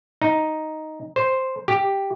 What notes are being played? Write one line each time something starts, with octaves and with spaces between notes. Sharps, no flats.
D#4
C5
G4